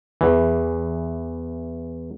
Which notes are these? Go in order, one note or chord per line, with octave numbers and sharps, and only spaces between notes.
E2 E3